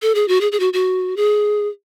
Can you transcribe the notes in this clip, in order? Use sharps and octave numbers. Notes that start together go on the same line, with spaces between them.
A4
G#4
F#4
G#4
G#4
F#4
F#4
G#4